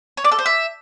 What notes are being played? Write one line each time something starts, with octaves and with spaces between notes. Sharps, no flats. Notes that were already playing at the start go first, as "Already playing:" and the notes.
C#5
D5
A4
C5
E5